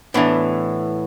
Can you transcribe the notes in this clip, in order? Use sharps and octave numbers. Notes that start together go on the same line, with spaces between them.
A2 E3 B3 D4